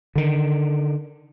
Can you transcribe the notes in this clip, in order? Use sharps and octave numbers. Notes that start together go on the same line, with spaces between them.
D3 D#3